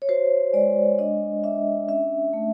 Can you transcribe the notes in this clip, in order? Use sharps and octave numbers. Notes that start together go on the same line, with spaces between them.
C#5
F#4 C5
G#3 D5
D4 D#5
D4 E5
C#4 E5
A3